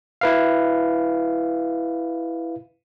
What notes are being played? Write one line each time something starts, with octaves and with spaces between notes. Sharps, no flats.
E4 B4 F5